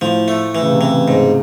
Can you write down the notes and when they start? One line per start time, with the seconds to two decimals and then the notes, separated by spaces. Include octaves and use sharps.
0.01 A2 F3
0.28 A3
0.55 E3
0.61 C#3
0.72 C3
0.81 E3
0.90 C#3
1.08 G#2